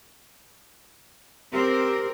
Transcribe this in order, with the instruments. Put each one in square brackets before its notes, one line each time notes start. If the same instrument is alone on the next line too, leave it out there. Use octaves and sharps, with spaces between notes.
[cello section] C4 A#4 [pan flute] G4